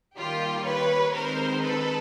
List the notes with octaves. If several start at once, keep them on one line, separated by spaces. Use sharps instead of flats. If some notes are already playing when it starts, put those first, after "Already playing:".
D#3 G3 A#3 F4 G4
B4 C#5
D#3 G#3 C4 D#4 A#4 C5
A4 B4